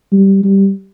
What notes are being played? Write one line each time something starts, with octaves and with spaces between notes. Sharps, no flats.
G3
G3